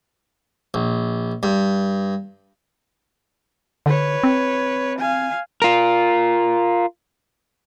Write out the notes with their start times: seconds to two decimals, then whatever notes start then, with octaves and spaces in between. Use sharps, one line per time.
0.74 A#1
1.43 G2
3.86 D3 B4 C#5
4.23 C4
4.99 F5 G#5
5.62 F4 A#4